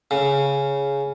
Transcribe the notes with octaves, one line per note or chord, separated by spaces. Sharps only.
C#3